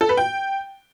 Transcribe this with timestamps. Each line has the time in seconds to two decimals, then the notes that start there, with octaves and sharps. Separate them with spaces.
0.01 A4
0.09 B4
0.17 G5